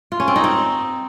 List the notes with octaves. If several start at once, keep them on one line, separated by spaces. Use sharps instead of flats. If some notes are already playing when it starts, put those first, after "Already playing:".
F4
C#4
C4
D#4
C4